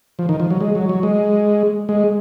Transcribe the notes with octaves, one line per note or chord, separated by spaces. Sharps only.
F3
D#3
F3
F#3
G#3
F#3
F#3
G#3
G#3